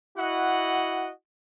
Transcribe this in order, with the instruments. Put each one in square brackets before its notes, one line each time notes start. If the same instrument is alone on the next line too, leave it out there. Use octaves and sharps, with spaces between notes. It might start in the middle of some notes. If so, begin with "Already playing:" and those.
[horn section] E4 F#4 D#5 F#5